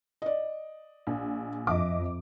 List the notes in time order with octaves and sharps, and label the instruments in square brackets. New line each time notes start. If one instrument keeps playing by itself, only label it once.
[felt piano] D5 D#5
[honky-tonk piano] A#1
[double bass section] F2 [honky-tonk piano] D#5 E5 D6